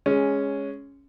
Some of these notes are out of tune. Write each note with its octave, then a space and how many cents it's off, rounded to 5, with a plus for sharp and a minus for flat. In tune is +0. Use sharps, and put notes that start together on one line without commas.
G#3 +0 C#4 +5